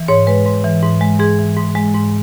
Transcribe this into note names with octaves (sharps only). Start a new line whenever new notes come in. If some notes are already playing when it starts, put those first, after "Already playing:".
Already playing: E3
G#2 C#5
G#3 B4
G#2
E3
G#2
G#3
G#2 G#4
E3
G#2
G#3
G#2